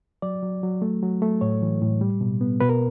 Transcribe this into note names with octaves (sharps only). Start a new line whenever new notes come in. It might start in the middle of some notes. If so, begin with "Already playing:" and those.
F#3 D5
F#3
F#3
A3
F#3
A3
A2 C#5
E3
A2
G3
B2
B3
B2 B4
A#4